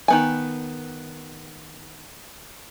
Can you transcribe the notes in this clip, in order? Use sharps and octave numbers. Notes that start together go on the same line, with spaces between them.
D#3 B3 G#5